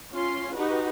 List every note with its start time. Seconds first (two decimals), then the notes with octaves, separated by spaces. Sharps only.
0.11 C#4 F4 C6
0.53 D#4 F#4 G4 B4